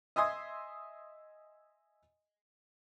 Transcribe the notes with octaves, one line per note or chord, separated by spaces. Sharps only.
D#5 E5 G#5 C6 D#6